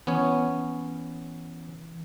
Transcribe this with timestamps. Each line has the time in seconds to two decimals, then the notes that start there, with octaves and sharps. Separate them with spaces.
0.07 E3 B3 C#4 C#5